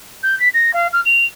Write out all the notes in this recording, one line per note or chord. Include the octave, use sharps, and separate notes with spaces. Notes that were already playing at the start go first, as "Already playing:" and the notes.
G6
B6
A#6
F5
F6
F7